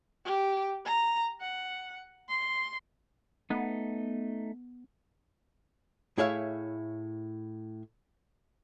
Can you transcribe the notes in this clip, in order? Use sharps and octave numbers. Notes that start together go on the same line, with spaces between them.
G4
A#5
F#5
C6
A3 B3 D#4
A2 E4 G#4 C#5 E5 F5